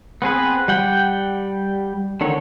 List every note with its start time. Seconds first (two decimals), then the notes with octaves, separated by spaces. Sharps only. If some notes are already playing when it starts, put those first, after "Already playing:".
0.22 B3 C4 G#4 B4
0.68 G3 F#5 G5
2.21 D3 D#3 C#5